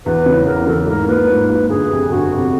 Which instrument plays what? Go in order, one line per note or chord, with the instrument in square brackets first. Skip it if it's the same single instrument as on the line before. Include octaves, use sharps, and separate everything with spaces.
[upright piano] E2 [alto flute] B4
[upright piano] C#3 E3
[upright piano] E2 [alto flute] A#4
[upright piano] C#3 E3 [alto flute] A4
[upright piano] G#2 [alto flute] A#4
[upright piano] F3 A#3 [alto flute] B4
[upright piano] G#2
F3 A#3
[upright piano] G1 [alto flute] G#4
[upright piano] F2 C3
[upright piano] G1 [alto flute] F#4
[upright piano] F2 C3